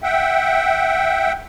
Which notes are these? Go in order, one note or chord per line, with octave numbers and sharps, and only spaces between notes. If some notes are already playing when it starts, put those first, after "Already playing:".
E5 F#5 G5